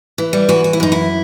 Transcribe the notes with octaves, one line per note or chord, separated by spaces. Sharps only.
E3
G3
E3 F#4
F#4
E4
F#2 D#4
E4